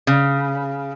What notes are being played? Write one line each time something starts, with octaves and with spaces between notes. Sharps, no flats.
C#3